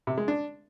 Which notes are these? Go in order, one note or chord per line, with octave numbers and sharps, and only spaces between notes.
C3
G#3
D4